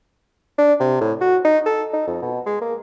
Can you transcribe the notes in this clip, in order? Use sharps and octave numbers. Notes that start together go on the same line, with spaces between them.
D4
C3
A2
F#4
D#4
A4
D#4
F2
B2
G#3
A#3